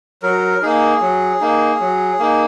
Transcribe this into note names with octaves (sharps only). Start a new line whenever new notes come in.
F#3 A#4
A#3 D#4 G#4
F#3
A#3 D#4
F#3
A#3 D#4